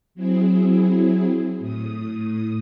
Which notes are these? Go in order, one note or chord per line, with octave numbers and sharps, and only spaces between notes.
F#3 C4 E4 G#4
A2 D#6